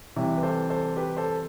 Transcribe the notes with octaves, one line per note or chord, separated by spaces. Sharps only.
C3 E3 G3 E4
B4
A4 C5
A4 C5
G4 B4
A4 C5